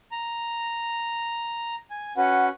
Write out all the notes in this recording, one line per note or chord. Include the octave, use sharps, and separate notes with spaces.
A#5
G#5
C#4 F#4 B4 F#5